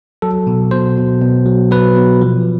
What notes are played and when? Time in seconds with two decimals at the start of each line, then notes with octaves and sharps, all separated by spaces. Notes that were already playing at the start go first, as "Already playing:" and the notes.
0.22 F#3 A4
0.47 B2
0.71 B2 C5
0.97 B2
1.22 B2
1.46 F#3
1.71 F#3 B4
1.96 B2
2.21 F3